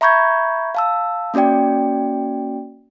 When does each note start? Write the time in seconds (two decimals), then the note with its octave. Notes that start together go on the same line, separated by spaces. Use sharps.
0.01 E5 A#5 B5 C#6 G6 G#6
0.75 F5 A5 E6
1.34 A#3 C#4 F#4 D5 G5